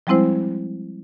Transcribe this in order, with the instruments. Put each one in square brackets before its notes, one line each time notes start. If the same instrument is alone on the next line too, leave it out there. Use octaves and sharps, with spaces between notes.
[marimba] F3 G3 G#3 C4 E4 C5